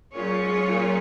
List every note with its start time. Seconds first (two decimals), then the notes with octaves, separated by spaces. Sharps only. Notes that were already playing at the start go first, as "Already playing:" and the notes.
0.14 A#2 F#3 C#4 F4 G#4 C#5
0.42 G#2
0.69 A#2